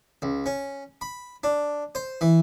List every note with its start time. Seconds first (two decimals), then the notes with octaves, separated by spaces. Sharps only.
0.22 C#2
0.46 C#4
1.01 B5
1.44 D4
1.95 C5
2.21 E3